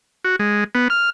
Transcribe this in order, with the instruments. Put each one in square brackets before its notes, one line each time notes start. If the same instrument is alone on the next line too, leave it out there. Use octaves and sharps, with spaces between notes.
[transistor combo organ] F#4
G#3
B3
F6